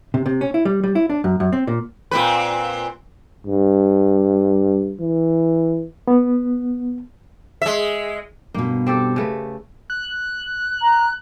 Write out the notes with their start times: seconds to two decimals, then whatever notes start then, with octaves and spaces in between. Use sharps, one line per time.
0.14 C3
0.26 C3
0.41 C#4
0.54 E4
0.65 G3
0.84 G3
0.95 E4
1.10 D4
1.24 F#2
1.40 F#2
1.53 C4
1.67 A#2
2.11 A#2 C4 B4
3.47 G2
5.01 E3
6.08 B3
7.62 G#3 E5
8.54 G2 B2 A#3
8.86 C4 G4 A4
9.16 C#3 A3 B4
9.90 F#6
10.81 A#5